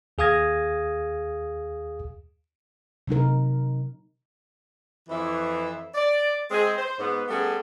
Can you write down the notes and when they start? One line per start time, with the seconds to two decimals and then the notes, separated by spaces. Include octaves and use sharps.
0.18 D#2 G#4 F5 D#6 G#6 A#6
3.07 C3 F#3 D#4 A#4
5.09 F2 E3 E5
5.95 D5
6.50 G#3 C4 G#4
6.77 C5
6.99 G#2 B3
7.28 G3 A3 B3 C#4 G#4 A4